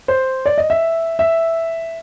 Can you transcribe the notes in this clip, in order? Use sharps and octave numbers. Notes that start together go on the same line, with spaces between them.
C5
D5
D#5
E5
E5